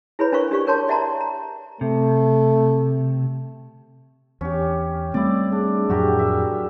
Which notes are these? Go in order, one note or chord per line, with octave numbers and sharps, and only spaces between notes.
E4 G#4 B4 C#5 B5
D4 A#4 C5 F5 C#6
D4 G4 D5 F5 C#6
D4 A#4 C#5 A5 C6 D6
D5 E5 F#5 A5 A#5 C6
A#5
C3 A3
E2 C#4 G4
G3 A3 C4 E4 D5
D4 G#4
F2 A2 F#3 F#4 G4 A#4
E5